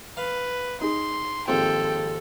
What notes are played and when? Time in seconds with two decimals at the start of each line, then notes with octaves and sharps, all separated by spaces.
0.17 B4 F5
0.81 D#4 G#4 C6
1.48 D#2 G#2 F3 C4 A4 G5